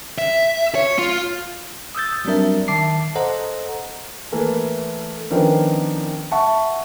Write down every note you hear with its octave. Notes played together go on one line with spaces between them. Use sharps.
E5
C#5
F4
D#6 E6 G6 A6
F#3 G3 C4 D4 A#4 E5
D#3 E5 A5 D6 C7
A4 C5 D#5 F#5 A#5
E3 A3 A#3 A4 B4
D#3 F3 B3 C#4 D4 A#4
E5 F#5 A5 C#6